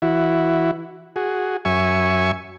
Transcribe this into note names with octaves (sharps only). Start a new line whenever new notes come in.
E3 E4 F#4
F#4 G#4
F#2 E5 G#5 C#6